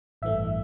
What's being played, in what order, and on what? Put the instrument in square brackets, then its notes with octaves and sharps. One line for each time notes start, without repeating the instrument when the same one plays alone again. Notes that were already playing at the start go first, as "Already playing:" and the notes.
[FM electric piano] A1 G2 E3 A3 E5